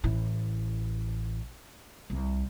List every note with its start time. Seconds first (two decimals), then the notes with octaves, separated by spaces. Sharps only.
0.04 A1 E4
2.10 C2